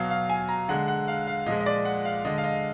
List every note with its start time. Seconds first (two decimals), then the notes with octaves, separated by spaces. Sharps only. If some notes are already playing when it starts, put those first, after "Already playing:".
Already playing: B2 F#3 F5
0.10 F5
0.30 G#5
0.49 A#5
0.69 D3 G#3 F#5
0.88 F#5
1.08 F5
1.27 F5
1.46 A#2 F3 G#3 D#5
1.61 D#5
1.66 D5
1.85 F#5
2.05 F5
2.25 D3 G#3 D#5
2.38 F5
2.44 D#5